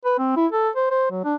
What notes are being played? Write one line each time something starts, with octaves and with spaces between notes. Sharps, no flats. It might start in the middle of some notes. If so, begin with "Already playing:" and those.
B4
C4
E4
A4
C5
C5
F#3
D4